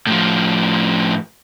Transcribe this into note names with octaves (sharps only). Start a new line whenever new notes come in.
A2 F3